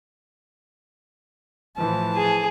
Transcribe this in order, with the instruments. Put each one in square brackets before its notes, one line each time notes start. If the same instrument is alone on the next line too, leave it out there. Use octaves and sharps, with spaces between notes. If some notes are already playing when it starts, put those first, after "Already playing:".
[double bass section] A2 E3 F3 [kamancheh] A5
[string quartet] G#4